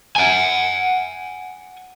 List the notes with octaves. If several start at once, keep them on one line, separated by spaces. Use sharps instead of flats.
F#5 G#5